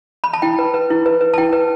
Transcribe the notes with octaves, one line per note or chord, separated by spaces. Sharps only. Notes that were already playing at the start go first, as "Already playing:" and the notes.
B5
A5
E4 G5
B4
B4
E4
B4
B4
A5
E4 G5
B4